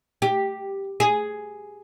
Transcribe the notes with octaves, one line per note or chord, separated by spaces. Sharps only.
G4
G#4